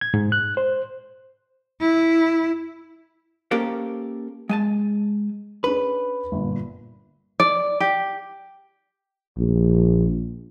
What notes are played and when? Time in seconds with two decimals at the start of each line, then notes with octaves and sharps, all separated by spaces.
0.01 G#6
0.14 G#2
0.32 F#6
0.57 C5
1.81 E4
3.51 A#3 C#4 G4 A4 A#4 C5
4.49 G#3 G#5 A5
5.64 C#4 D4 G#4 B4
6.32 G1 A#2
7.40 D5
7.80 G4
9.38 A#1